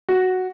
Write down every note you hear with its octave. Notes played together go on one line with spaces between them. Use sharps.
F#4